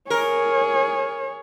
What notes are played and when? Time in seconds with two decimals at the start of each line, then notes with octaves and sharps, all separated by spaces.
0.10 G#4 A#4 C#5